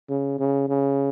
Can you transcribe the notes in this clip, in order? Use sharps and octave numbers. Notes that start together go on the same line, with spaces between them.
C#3
C#3
C#3